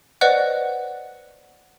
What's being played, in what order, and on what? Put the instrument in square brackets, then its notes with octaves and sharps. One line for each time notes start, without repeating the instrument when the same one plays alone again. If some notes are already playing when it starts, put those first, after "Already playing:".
[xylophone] B4 C5 D5 D#5 F#5 F#6